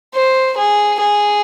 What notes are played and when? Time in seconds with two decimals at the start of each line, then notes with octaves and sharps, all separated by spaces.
0.15 C5
0.58 G#4
1.00 G#4